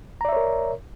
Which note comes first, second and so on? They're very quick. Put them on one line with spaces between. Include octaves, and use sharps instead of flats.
A#5 D5 E5 C#5 A#4